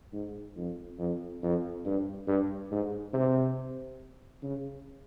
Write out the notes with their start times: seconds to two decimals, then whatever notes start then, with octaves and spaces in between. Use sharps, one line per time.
0.13 G#2
0.56 F2
0.99 F2
1.42 F2
1.86 G2
2.27 G2
2.71 G#2
3.14 C3
4.43 C#3